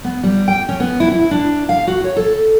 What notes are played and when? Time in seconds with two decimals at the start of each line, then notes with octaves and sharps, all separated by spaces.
0.04 B3
0.23 G3
0.48 G5
0.69 C#4
0.80 B3
1.00 E4
1.11 E4
1.31 D4
1.69 F5
1.87 F#4
2.04 C#5
2.16 A4